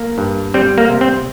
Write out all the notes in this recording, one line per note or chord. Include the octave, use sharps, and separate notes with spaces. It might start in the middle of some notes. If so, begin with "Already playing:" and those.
Already playing: A#3
G2
G3 C4
A#3
C3
C4